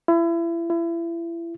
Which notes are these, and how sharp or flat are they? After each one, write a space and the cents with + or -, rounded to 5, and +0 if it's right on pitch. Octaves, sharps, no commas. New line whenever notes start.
E4 +35
E4 +35